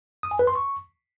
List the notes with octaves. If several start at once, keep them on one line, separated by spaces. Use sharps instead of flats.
D#6
G#5
B4
C6
C#6